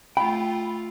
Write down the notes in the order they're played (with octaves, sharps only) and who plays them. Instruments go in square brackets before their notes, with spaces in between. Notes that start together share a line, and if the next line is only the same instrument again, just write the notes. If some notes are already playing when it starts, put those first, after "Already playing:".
[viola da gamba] A3 F4 [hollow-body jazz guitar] G5 [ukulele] B5